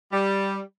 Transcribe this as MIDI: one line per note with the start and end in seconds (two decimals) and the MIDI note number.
0.12 0.61 55